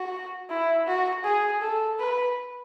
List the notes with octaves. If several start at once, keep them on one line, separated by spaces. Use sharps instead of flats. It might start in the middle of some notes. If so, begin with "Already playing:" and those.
Already playing: F#4
E4
F#4
G#4
A4
B4